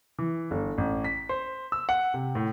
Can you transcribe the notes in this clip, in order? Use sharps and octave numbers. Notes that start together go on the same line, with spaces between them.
E3
G1
A1
B6
C5
E6
F#5
C3
A2